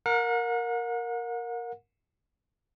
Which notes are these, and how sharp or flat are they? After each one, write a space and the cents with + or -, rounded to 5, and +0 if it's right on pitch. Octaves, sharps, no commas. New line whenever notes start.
A#4 +0 F#5 -40